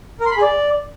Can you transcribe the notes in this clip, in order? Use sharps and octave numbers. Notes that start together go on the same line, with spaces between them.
A#4
C6
B5
G#4
D5